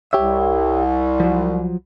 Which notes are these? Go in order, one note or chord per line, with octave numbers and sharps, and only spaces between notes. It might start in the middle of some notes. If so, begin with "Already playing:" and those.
C2 G4 C#5 E5
F3 F#3